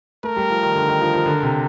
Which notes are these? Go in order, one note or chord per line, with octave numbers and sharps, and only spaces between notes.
A3 A#4
G3
F3
D#3
D3
D#3
F3
F3
D3
C3